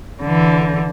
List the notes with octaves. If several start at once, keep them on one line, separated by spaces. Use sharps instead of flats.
D3 E3